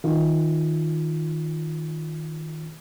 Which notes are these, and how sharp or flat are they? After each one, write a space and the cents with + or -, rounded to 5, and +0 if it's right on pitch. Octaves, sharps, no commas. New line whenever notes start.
D#3 +10 F4 +5